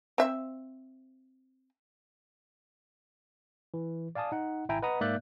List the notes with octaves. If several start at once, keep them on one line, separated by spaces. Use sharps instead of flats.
C4 E5
E3
D5 F5 G#5 A5 D#6
D#4 F#5
G#1 E4 E5 G5 G#5 A#5
B4 D#5 F#5 A#5 D#6
G#2 A#3 D5 E5 F#6 G6